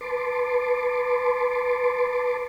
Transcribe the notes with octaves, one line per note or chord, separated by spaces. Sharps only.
B4 A5 C6 D6